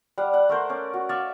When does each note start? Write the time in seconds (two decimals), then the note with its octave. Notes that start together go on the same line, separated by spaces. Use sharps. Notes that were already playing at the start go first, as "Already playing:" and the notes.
0.18 G3 F5 F#5
0.34 F#5
0.49 A3 A#4 C5
0.70 C#4 D5
0.94 F#4
1.09 D5 E5 F5 C#6